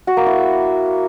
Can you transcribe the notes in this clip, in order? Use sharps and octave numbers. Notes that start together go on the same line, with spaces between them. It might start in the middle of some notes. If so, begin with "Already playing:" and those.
F#4
A#3
E4